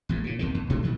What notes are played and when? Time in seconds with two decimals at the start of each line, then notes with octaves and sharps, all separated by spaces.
0.09 A1 D#2 G#2
0.24 A#2 C#3
0.39 D#2 C3 D#3
0.54 D#2
0.70 B2 D3 F#3 A3
0.83 A#2 D#3 F3 F#3